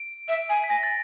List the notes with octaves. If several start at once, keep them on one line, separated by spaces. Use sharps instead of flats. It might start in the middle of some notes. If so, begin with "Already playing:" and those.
Already playing: D7
E5
G#5
B6
G#5 A#6
A6